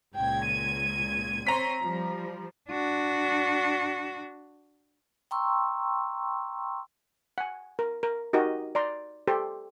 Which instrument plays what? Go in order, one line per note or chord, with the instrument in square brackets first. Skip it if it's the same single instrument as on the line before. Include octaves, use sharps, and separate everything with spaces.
[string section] C#2 A#2 G#6 [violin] G5
[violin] D#7
[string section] C4 C#5 C6 [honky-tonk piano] A#5 B6
[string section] F3 G3
[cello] D4 F#4
[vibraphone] G5 A#5 C6 C#6 E6
[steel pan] F#5 G#5
A#4
A#4
D#4 F#4 G4 A#4 D#5
D5 A#5 C6
G4 A4 C5 C6